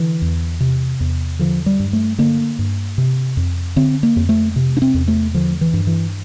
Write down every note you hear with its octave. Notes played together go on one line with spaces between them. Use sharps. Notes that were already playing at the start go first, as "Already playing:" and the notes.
Already playing: D3 E3
E2
C3
E2
D3 F3
G3
G2
A3
D3 A#3
G2
C3
F2
D3 C4
A#3
F2
A3
C3
D4
C4
E2
A3
D3 F3
E3
G2
E3